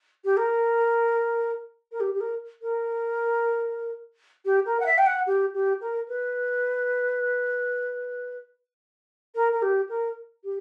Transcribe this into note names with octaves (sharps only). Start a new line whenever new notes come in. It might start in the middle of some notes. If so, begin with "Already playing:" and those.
G4
A#4
A#4
G4
G4
A#4
A#4
G4
A#4
F#5
E5
G5
F#5
G4
G4
A#4
B4
A#4
A#4
G4
A#4
G4